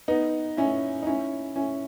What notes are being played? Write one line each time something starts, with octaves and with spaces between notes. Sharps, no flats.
B3 D#4
C#4 E4
D#4
C#4 E4
C#4 E4